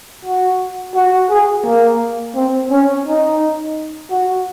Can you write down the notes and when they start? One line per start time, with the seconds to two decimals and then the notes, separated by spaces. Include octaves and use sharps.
0.25 F#4
0.95 F#4
1.30 G#4
1.65 A#3
2.35 C4
2.71 C#4
3.06 D#4
4.11 F#4